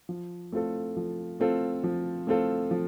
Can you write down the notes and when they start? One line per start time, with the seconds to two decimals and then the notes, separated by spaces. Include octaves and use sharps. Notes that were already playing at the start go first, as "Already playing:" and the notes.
0.09 F3
0.52 A3 C4 F4 A4
0.97 F3
1.40 A3 C4 F4 A4
1.84 F3
2.27 A3 C4 F4 A4
2.71 F3